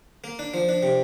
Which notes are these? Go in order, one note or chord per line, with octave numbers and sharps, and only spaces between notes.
A#3
D4
F3
D4
C3